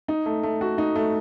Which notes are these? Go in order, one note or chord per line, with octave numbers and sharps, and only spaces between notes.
D#4
A3
A3
F#4
D#4
A3